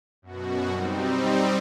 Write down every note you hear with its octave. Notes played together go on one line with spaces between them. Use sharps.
F#2 B2 F#4
G3 C4 D#4